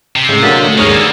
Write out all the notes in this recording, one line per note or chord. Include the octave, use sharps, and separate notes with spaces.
C3
A2 C#3 G#3
D3 F#3 A#3 D#6 A6 B6
A3
D#2 G#2 A#3 B3 G#4 C#5 D#6 F6
D5 G#5 E6